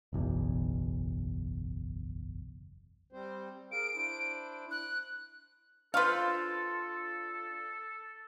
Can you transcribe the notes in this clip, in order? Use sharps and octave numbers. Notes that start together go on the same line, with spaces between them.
F#1 B1 E2
G3 C4 C5
G#4 A#4 F5 D7
D4 E4 C5
F#6
D4 F4 A4 B4 C5 F5